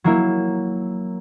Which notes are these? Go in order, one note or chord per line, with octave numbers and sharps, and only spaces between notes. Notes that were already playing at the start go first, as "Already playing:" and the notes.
F#3 A#3 E4